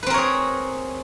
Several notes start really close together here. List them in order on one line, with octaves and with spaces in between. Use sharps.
B4 C4 A#4 C#5 G#4